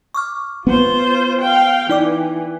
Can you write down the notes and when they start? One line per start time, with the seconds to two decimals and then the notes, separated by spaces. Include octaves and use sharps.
0.14 C#6 D6 F6
0.67 B3 F4 C5
1.42 F5 G5
1.89 E3 D#4 D5 D6